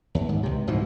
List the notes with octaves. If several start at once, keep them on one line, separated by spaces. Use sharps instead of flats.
D#2
G#2
C#2 C3
G#2 B2 E3 F3